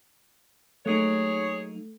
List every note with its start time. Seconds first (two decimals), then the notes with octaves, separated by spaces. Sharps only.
0.86 F#3 A3 A#3 D#4 G#4 C#5